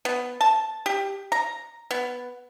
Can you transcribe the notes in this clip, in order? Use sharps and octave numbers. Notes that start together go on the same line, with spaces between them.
B3
A5
G4
A#5
B3